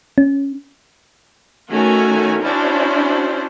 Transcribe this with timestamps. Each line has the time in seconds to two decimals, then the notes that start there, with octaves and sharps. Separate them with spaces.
0.18 C#4
1.69 D#3 A3 C#4 F#4 G#5
2.43 C#4 D4 E4 F#4 C5